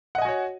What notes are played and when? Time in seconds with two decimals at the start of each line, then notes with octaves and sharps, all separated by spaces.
0.15 F#5
0.18 D#5
0.22 G#5
0.25 F#4
0.29 C#5